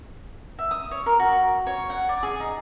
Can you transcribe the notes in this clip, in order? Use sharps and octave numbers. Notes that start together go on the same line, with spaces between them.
E5
D#6
C#5
A#4
F#4
C#5
F#5
D5
G#4
D#4